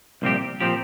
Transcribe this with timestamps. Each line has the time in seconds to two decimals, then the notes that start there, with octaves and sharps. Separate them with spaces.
0.22 C2 A#2 F3 C4 G4
0.60 A#2 F3 C4 G4